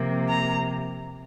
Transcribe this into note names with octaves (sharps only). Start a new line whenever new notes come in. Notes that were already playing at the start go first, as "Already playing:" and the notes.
Already playing: C3 F3 A#3
A#5